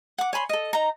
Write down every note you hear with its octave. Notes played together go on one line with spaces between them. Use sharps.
F#5 D6
C#5 G#5 B5 C6
A4 D#5
D#4 A#5